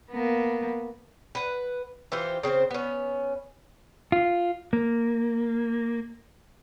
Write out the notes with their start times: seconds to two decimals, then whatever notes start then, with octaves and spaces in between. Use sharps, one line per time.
0.11 A#3 B3
1.35 B4 F#5
2.12 E3 F4 G4 C5
2.43 C#3 C4 A4 C5
2.71 B3 C#4
4.12 F4
4.73 A#3